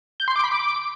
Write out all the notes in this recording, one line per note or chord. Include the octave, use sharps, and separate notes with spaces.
G6
C6
D6
B5
D6